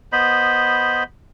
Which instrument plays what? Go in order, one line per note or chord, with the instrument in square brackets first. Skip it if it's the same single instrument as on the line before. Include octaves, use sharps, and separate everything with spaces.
[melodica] B3 C5 D#5 B5